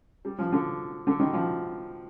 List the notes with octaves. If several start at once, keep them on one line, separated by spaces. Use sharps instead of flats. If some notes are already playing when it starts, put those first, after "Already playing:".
G3
F3
D3
D3
D#3
F3